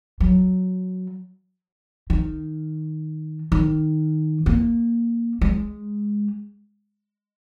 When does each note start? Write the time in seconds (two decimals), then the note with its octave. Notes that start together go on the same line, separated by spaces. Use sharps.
0.20 F#3
2.10 D#3
3.52 D#3
4.46 A#3
5.41 G#3